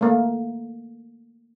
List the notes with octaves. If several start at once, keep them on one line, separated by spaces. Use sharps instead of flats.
A3 A#3